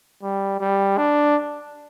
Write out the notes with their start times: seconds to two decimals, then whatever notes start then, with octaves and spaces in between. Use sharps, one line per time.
0.23 G3
0.60 G3
0.97 D4